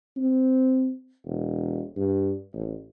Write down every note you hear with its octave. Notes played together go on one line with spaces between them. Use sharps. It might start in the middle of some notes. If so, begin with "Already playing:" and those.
C4
E1
G2
A1